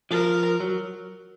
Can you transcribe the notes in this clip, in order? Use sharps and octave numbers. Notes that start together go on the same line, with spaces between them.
F3 A#4
F#3